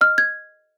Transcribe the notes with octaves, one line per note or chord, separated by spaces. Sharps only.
D#5 F6
G#6